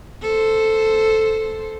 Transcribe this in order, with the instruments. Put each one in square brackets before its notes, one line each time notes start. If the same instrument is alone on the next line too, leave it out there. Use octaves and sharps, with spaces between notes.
[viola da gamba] A4 C5